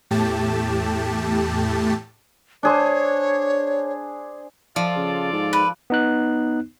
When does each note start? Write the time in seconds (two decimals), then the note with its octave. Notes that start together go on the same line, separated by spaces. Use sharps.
0.11 E2 A2 A3 G4 A5
2.63 D4 G#4 C5 C#5
4.76 F3 F4 A4 D5
4.96 C#3
5.33 G#2
5.53 B4
5.90 B3 D#4 F#6